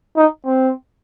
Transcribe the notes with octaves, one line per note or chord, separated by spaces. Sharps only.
D#4
C4